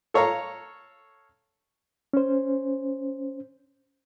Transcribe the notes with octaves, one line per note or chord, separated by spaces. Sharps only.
A4 C#5 F5 A#5 C#6
C#4 C5